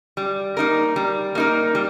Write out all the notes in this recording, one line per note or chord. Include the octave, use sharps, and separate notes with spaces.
G3
A#3 D#4 A#4
G3
A#3 D#4 A#4
G3